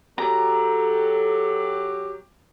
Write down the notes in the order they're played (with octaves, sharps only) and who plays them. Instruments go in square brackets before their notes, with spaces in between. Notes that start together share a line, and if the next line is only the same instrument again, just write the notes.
[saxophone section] F#3 G4 [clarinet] A4 [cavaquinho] A#5